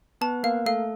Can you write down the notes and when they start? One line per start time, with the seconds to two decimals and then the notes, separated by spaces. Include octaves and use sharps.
0.21 B3 B4 A5
0.43 A#3 A#4 F5
0.66 A3 A4 F5